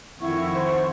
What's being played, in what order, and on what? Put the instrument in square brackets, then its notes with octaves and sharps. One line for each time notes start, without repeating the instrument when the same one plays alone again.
[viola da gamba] F2 D#3 [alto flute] E4 [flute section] F#5 G5 C#6
[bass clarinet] C5